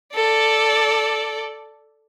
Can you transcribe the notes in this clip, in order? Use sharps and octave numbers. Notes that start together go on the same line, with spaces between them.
A4 D5